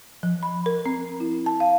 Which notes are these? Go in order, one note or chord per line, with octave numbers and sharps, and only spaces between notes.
F3
B5
A#4
C4
E4
A5
F5